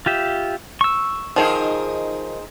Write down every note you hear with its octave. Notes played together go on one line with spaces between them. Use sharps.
F4 G4 E5
C#6 E6
D#3 F3 D#4 G#4 C5